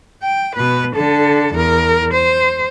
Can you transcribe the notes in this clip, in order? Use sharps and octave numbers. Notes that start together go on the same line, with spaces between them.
G5
B2 B4
D3 A4
E2 A#4
C5